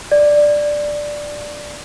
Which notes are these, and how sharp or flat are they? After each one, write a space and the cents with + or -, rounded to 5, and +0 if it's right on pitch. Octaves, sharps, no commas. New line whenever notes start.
D5 +5